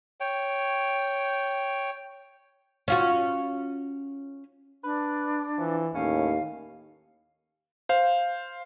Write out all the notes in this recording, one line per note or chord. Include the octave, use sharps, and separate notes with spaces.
C#5 G5
C#4 F4 F#4
D4 B4
E3 F3
D#2 A2 C#4 F5
C5 F5